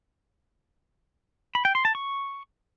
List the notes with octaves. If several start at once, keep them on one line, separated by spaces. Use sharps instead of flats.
B5
G5
C6
A5
C#6